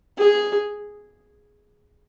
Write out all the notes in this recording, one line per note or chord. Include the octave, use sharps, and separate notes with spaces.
G#4